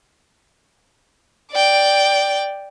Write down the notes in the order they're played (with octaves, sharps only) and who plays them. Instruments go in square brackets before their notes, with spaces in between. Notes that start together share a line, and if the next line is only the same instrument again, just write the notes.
[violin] D5 G5